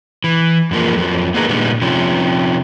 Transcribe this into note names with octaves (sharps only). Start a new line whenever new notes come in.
E3
F#2 F3 A#3
F2 F3 F#3
A#3 B3 D#4 G#4 A#4
A#2 D3 D#3 G3 G#3 B3
C3 F3 C#4